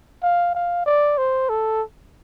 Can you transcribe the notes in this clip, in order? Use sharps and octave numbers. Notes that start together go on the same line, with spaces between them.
F5
F5
D5
C5
A4